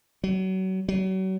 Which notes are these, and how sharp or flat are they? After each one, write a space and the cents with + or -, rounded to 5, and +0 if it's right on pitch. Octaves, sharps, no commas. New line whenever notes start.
F#3 +30
F#3 +35